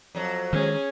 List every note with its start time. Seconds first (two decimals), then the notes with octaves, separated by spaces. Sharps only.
0.15 F2 F#3
0.53 D#3 G#3 C#4 G#4